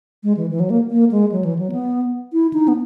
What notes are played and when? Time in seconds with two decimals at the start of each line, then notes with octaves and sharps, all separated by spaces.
0.23 G#3
0.37 E3
0.50 E3
0.60 F#3
0.70 A#3
0.90 A#3
1.11 G#3
1.32 F#3
1.45 E3
1.59 F#3
1.72 B3
2.33 E4
2.53 D#4
2.68 B3